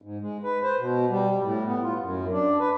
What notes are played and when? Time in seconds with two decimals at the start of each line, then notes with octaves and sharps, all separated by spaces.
0.02 G#2
0.21 G#3
0.44 B4
0.63 C5
0.79 B2
1.10 G3
1.42 A2
1.66 B3
1.83 F4
2.00 F#2
2.32 D4
2.60 B4